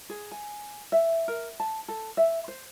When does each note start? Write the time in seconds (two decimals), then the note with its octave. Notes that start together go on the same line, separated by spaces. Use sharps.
0.10 G#4
0.31 G#5
0.92 E5
1.28 A#4
1.60 A5
1.88 A4
2.17 E5
2.48 C5